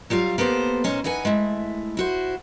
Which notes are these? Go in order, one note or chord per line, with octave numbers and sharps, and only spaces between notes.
F#3 G3 F4 F5
A#3 B3 G4 A4 C5
A#2 C#4 D#4 C5
E3 D#4 B4 F#5 G#5
G#3 A3 E4
E4 F#4 C5